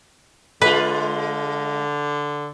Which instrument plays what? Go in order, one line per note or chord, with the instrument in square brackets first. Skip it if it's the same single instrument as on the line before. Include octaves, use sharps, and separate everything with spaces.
[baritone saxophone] D3 [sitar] G#3 F4 [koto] B4